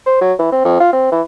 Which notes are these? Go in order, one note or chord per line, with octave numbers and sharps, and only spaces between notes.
C5
F#3
E3
C4
F2
F4
C4
E3